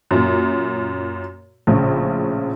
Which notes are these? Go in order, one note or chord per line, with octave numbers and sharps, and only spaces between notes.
F#2 A#2
A#1 A2 C#3